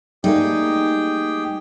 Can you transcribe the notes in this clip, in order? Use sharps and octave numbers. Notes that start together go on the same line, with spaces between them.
G3 A3 A#3 D#4 G4 G#4 G5